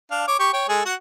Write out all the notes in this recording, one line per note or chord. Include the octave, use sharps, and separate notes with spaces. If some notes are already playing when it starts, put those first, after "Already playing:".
D4 F5
C#5 D6
G4 C#6
C#5 G5
G#3 G#4 A4
F#4 F#5